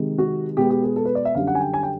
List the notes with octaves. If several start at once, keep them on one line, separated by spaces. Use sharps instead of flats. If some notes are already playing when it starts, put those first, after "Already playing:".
Already playing: C3 D#3 G#3
F#4
B2 G#3 B3 G4
G4
G#4
A4
B4
D5
E5
F#2 D3 G3 F5
F#5
G#5
G5
G#5
G5